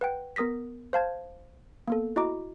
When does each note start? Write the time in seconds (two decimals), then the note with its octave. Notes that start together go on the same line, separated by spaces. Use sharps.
0.01 B4 F#5 G5
0.36 B3 A#4 D#6 A#6 B6
0.93 C5 F5 A5 G#6
1.88 A#3 B3 A4
2.16 E4 F#4 D#5 A#5 D6